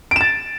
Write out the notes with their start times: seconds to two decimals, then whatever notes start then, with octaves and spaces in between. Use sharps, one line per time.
0.11 D7
0.16 E7
0.21 A6